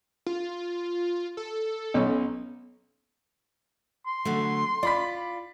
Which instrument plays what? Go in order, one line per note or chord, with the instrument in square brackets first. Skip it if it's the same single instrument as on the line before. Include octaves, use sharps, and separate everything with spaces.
[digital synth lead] F4
A4
[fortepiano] B1 C#4 [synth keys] B3
[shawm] C6
[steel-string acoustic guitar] D3 F#3 A3
[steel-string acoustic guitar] F4 [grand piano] D5 B5 B6